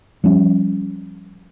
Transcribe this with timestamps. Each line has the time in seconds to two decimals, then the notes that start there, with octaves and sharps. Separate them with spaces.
0.24 F3 G3 C#4